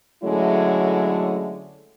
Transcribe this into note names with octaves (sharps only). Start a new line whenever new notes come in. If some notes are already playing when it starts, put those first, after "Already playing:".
D3 F#3 G#3 A3 C#4 E4